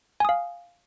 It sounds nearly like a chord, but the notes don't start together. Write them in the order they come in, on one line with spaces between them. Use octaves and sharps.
G#5 D#6 F5